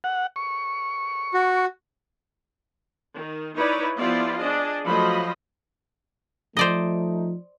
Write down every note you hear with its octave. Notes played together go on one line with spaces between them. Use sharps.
F#5
C#6
F#4
D#3
D#4 E4 B4 C#5 D5
F3 B3 E4 F4 G4 D5
D4 G#4 D#5
F3 F#3 A3 D#5 B5
F3 A3 D#4 C5 D5 D#5